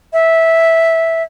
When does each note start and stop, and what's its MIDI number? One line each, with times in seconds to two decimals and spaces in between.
0.13 1.23 76